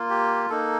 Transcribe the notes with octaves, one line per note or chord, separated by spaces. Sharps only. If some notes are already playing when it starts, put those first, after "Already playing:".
Already playing: A#3 F4
G4
A#3 D#4 A4